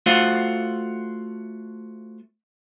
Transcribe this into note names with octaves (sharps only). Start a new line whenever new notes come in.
A3 F4 F#4 C5 F5 F#5